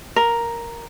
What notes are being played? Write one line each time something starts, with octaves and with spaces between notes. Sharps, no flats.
A#4